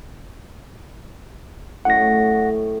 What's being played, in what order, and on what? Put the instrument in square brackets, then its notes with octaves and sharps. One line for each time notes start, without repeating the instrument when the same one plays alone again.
[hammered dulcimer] F#2 A2 D#5 [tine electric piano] F#5 A#6